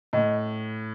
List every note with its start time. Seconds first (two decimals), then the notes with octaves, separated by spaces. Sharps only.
0.13 A2 D#5